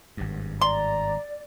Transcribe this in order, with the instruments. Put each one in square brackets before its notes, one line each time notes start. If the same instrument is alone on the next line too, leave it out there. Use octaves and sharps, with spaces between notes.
[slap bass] G#1 G2
[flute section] D5 [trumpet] A#5 [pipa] C6